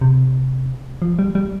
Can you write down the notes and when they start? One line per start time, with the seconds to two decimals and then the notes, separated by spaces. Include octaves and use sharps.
0.01 C3
1.02 F3
1.19 G3
1.35 G3